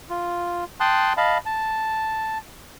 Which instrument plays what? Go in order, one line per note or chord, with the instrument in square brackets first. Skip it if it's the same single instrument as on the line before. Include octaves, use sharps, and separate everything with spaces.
[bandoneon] F4
G5 A5 C6 D#6 F#6
D#5 F5 A5 B5
A5